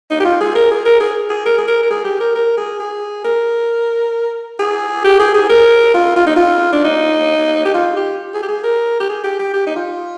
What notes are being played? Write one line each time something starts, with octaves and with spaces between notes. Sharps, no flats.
D#4
G4
F4
G#4
A#4
G#4
A#4
G#4
G#4
A#4
G#4
A#4
A#4
G#4
G4
A#4
A#4
G#4
G#4
A#4
G#4
G4
G#4
G#4
A#4
F4
F4
D#4
F4
D4
D#4
G4
F4
G4
G#4
G4
G#4
A#4
G4
G#4
G4
G4
G4
D#4
F4